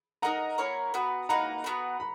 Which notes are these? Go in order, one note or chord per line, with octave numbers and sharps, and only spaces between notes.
D#4 A#4 D#5 F#5 A#5
A#3 E4 A#4 C#5
B3 F#4 B4
A#3 D#4 F#4 B4 F#5 A#5
B3 D#4 F#4 B4
B5